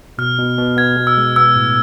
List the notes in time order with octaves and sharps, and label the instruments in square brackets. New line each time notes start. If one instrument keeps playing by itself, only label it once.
[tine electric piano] B2 [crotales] F6
[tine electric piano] B2
B2
[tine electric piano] B3 [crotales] G#6
[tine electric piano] B2
[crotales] E6
[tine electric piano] G#3
[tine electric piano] B3 [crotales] E6
[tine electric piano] A2